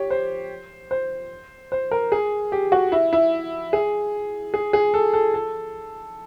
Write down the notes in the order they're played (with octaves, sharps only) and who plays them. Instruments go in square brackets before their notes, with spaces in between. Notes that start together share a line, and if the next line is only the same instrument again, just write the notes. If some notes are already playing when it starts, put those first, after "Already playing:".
Already playing: [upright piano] G4 C#5
C5
C5
C5
A#4
G#4
G4
F#4
E4
E4
G#4
G#4
G#4
A4
A4
A4